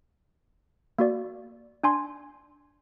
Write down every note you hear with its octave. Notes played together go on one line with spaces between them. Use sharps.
A#3 F#4 D5
D4 G#5 C6